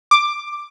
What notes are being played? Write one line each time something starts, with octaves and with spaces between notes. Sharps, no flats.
D6